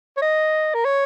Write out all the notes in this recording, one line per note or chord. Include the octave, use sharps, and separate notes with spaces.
C#5
D#5
A#4
C#5